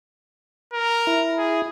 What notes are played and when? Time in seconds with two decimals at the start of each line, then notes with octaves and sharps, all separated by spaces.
0.74 A#4
1.07 E4
1.38 G#4